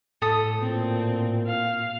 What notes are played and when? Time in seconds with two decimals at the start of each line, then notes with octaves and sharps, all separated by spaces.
0.22 A2 A4 D#6
0.59 A#2 C4
1.47 F5